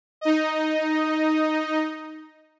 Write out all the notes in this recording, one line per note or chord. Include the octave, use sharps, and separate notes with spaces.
D#4 D#5